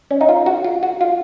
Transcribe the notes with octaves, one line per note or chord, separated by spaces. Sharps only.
C#4
D#4
F4
F#4
F4
F#4
F4